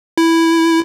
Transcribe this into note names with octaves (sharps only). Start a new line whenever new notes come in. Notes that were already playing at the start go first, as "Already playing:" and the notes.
E4